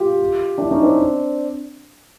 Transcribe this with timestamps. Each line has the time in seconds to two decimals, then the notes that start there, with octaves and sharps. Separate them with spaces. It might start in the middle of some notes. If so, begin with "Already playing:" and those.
Already playing: F4 G4
0.58 D4 E4
0.70 C#4 D#4
0.83 C4 D4